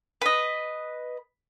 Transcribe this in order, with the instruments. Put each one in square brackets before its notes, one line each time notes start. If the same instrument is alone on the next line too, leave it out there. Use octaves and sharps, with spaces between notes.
[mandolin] B4 D#5